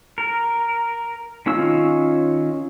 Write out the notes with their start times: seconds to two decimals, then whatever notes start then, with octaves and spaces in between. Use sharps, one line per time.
0.18 A#4
1.46 D#3 C#4 F4 E6